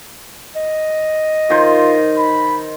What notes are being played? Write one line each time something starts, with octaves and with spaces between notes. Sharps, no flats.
D#5
D#3 F4 C5
B5